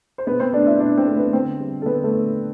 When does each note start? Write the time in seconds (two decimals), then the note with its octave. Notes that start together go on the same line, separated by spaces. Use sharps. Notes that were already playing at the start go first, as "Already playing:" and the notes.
0.18 C5
0.27 B2 B3 B4
0.40 C4 C5
0.53 A3 D4 D5
0.66 E4 E5
0.80 B2 D4 D5
0.97 C4 C5
1.07 A3
1.16 B3 B4
1.32 D3 C4 C5
1.60 G3
1.82 A4
1.85 D3 B3 B4
2.04 A3 A4